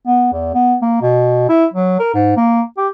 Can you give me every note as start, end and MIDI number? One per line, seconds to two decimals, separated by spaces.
0.07 0.27 59
0.32 0.50 40
0.54 0.76 59
0.82 0.99 58
1.02 1.48 47
1.49 1.66 64
1.73 1.98 54
1.99 2.12 70
2.14 2.36 44
2.36 2.62 58
2.77 2.88 67